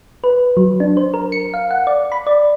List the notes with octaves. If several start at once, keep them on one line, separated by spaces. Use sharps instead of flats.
B4
F#3
D4
C5
A#4
C#7
F5
F#5
D5
B5
D5